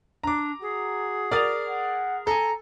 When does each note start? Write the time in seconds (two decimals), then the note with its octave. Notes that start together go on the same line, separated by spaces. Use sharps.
0.23 D4 A#5 D6
0.61 F#4 G#4
1.32 A#4 D5 D#6 A6 F7
1.68 F#5
2.27 A4 G#5 A#5